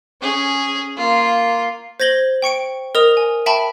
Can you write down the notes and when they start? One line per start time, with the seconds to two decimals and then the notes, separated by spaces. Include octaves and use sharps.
0.22 C#4 G#4
0.97 A#3 F4
2.00 C5 G#6 A#6 F#7 G7
2.42 G5 C#6 C#7 D7
2.95 A#4 D#5 D#6 F7
3.17 G#5
3.46 E5 G5 A5 B5 C#6